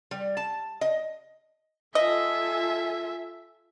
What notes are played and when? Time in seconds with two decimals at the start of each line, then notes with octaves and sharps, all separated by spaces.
0.11 G3
0.37 A5
0.81 D#5
1.95 F4 A4 D#5 E5 G#5